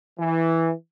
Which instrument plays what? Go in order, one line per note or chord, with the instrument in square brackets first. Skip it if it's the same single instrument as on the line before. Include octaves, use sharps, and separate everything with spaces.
[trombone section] E3